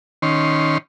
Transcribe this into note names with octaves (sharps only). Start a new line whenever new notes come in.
D#3 C#4 C6